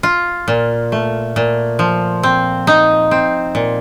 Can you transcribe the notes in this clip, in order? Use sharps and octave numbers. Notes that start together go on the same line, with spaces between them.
F4
A#2
A3
A#2
F3
C4
D#4
C4
A#2